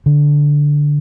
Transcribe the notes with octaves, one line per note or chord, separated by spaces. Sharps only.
D3